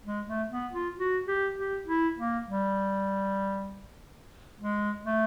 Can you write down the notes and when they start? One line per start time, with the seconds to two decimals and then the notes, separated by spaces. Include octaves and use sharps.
0.05 G#3
0.27 A3
0.51 B3
0.73 F4
0.97 F#4
1.27 G4
1.56 G4
1.87 E4
2.18 A#3
2.48 G3
4.60 G#3
5.05 A3